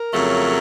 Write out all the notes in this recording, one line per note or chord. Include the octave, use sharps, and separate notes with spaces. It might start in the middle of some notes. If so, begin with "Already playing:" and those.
Already playing: A#4
F2 C#3 F#3 A3